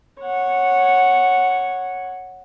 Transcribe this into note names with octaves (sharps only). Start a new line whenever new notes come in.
C#5 F#5